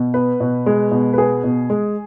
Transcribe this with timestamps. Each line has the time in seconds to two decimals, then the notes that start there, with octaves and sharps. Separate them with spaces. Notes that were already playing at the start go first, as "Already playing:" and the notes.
Already playing: B2
0.14 B3 B4
0.40 B2
0.66 G#3
0.91 B2
1.13 B4
1.18 B3 G#4
1.44 B2
1.70 G#3